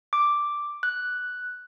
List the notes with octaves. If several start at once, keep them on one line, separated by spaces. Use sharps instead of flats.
D6
F#6